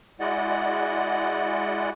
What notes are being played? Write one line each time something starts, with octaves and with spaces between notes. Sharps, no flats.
G#3 E4 F#4 D5 D#5 F#5